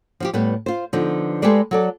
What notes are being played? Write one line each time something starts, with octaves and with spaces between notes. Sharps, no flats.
F3 F#4 G4
A2 G3 B3 B4
F4 C5
D3 F3 B3 D#4
G#3 G4 A4 B4 C5 D5
F#3 A4 D5